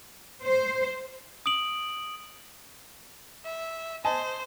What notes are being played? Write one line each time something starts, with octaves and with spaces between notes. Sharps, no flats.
C5
D#6 D7 F#7
E5
C5 D#5 G#5 A5